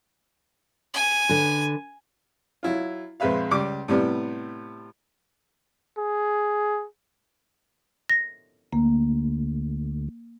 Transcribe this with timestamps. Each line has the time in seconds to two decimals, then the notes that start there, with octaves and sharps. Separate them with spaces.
0.94 G#5
1.29 D3 B4
2.63 F#3 E4 F4
3.20 A#1 F2 G#3 B4 E5 F5
3.51 C#2 G3 D6
3.88 A2 C3 G3 B3
5.98 G#4
8.10 A#6
8.73 D2 A#3